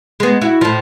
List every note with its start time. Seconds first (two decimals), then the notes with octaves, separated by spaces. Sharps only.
0.20 G#3 B3
0.41 E4 F#4
0.61 A2 F3